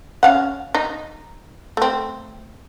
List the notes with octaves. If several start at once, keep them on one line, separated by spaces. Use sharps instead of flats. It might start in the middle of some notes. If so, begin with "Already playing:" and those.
C#4 F5 F#5
D#4
A3 C4